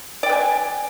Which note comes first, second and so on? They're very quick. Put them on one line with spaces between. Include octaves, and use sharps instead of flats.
D5 G5 B4 G#5